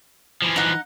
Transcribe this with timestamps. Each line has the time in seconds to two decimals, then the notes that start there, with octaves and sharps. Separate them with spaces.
0.42 E3 F3
0.56 D#4 F#5